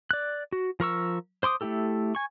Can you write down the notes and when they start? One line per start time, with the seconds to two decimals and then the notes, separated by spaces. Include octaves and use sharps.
0.11 D5 F#6
0.52 F#4
0.80 F3 A#4 C#6 E6
1.43 C5 C6 D6 D#6
1.61 A3 C#4 E4 G4 A4
2.15 G#5 C#6